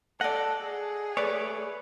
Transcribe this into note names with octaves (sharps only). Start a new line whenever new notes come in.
A4 D5 D#5 F#5
G#4
A3 B4 C#5 D5